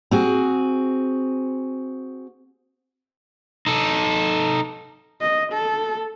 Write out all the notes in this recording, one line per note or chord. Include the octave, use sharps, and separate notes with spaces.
C4 F#4 G#4
D#4 A4
D#5
A4